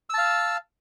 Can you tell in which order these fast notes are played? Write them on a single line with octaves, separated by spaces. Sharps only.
E6 A5 F5